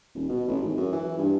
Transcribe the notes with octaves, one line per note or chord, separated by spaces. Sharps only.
D#1
B2
A1
G#1
F#2
E3
G2